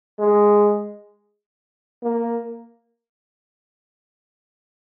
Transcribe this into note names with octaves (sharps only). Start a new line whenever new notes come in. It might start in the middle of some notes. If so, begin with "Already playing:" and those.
G#3
A#3